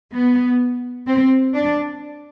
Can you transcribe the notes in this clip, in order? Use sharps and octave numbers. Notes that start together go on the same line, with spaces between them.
B3
C4
D4